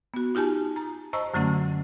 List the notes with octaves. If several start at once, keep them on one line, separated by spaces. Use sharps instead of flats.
B3 F#4
D#4 F4 G4 G#5 A5
A#5
C5 D#5 A5 A#5 C#6 E6
F#2 D3 F#3 A3 C#4 F#5